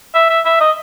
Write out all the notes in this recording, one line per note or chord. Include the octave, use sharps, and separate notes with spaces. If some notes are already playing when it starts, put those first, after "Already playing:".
E5
E5
E5
D#5